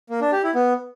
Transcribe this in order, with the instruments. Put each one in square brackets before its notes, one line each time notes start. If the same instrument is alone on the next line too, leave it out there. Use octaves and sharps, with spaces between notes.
[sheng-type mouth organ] A#3
D4
G4
E4
B3